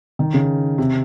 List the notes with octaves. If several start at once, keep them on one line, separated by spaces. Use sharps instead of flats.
D#3
C#3
C3